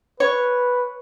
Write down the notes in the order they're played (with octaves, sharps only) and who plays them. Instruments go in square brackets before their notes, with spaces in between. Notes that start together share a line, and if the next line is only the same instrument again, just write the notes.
[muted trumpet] B4 [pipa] C#5